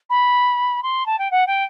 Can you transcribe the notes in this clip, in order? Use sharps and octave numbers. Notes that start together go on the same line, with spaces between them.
B5
C6
A5
G5
F#5
G5